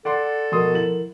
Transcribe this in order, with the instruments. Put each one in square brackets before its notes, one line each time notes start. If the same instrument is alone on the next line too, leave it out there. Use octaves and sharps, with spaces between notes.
[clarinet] A4 [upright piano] D5 F#5 C6
[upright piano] B2 C6 D#6 [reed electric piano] F3 A#4
[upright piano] E4 F#7